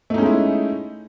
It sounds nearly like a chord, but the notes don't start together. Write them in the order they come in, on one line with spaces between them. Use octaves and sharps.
A3 D#4 C#4 G#3 E4